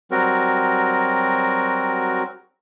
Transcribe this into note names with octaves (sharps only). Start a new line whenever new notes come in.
F#3 G3 C4 F#4 A#4